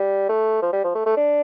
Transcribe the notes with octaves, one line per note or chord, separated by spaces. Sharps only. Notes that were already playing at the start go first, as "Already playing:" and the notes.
Already playing: G3
A3
F3
G3
F3
A3
A3
D4